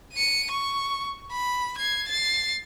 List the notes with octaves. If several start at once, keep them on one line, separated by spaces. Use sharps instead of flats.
C#7 D#7
C#6
B5
G#6 C7
A6 C7